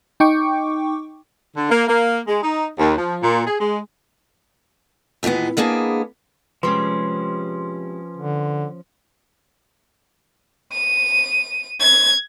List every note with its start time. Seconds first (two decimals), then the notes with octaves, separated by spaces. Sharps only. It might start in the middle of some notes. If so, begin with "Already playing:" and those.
0.20 D#4 G5 C#6 D6
1.57 D3
1.71 A#3
1.88 A#3
2.28 G#3
2.43 D#4
2.78 D#2
2.97 F3
3.23 A#2
3.47 G#4
3.61 G#3
5.23 D#2 A#2 E3 G#3 B3
5.57 G#3 A#3 B3 D4 G#4
6.63 C3 F3 G#3 C#4 G4 B4 C6
8.17 D3
10.72 D#7
11.80 G#6